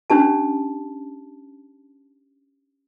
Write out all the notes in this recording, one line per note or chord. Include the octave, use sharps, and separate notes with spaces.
C#4 D4 G4 A5